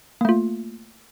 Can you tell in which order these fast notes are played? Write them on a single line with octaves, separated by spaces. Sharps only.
A#3 A3 F4